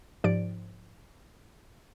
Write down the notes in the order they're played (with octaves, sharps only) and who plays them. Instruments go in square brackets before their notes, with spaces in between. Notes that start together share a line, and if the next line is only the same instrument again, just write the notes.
[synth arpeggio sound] G#2 F3 G4 D5 D7